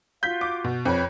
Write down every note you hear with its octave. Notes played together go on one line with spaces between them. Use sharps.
F4 F#4 F5 G6 B6
D6
B2
F2 B4 C#5 B5